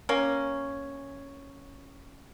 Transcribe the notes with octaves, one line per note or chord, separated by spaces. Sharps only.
A#3 C#4